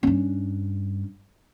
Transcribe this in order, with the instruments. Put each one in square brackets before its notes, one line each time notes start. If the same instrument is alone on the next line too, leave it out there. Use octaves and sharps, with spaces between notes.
[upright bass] G2 C#4